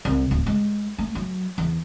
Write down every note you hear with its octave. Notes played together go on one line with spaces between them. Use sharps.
C2
D1
G#3
A3
F#3
E2